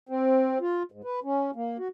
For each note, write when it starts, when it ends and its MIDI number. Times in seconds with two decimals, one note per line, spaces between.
0.09 0.58 60
0.61 0.83 65
0.92 1.01 44
1.04 1.20 71
1.24 1.51 61
1.56 1.77 58
1.79 1.88 66